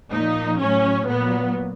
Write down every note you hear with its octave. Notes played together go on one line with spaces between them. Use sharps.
A#2 F3 D#4
A2 F#3 C#4
A#2 F#3 B3